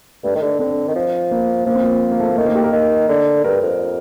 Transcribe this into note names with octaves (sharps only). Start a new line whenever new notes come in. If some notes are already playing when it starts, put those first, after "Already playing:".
G2 A3
D#3
D3
D3 C4
D#3
F3
A#3
F3 A#3
C4
A#3
A#3
A3
A#3
D#3 A3
A#3
G4
A#4
D#3
D3
G2 A#4
F2